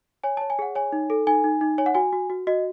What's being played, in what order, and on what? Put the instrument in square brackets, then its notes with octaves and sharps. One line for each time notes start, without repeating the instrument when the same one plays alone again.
[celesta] C#5 G#5
C#5 A5
G#5
G#4 F#5
C#5 G#5
D#4
A4
D#4 G#5
D#4
D#4
C#5 G#5
F#5
F#4 G#5
F#4
F#4
F#4 D#5